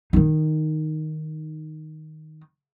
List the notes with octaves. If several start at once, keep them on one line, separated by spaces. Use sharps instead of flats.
D#3 D#4